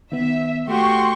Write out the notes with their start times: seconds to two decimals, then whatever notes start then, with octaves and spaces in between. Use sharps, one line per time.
0.12 D#3 B3 E5
0.68 A3 F#4 G4 C6 C#6